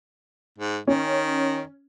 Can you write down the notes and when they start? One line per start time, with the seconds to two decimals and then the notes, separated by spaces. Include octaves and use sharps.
0.58 G#2
0.87 D#3 C#4